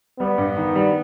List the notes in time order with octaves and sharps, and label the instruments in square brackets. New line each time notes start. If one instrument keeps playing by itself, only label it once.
[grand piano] G3 [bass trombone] B3
[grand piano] G2
D#3
G3